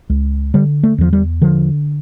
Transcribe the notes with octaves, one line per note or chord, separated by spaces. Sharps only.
C#2
D3 G3
A3
E2 F3
G3
D3 F3